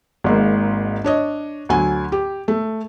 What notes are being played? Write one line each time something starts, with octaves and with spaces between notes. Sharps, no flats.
G#1 G#2 A#3
D4 C#5 D#5
D2 F#3 G#5
G4
A3